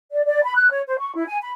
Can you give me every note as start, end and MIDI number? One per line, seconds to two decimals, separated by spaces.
0.11 0.24 74
0.25 0.43 74
0.43 0.55 83
0.56 0.70 90
0.71 0.81 73
0.87 0.96 72
0.99 1.13 85
1.15 1.24 64
1.27 1.38 80
1.41 1.51 83